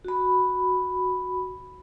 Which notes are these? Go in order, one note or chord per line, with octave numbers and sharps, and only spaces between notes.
F#4 B5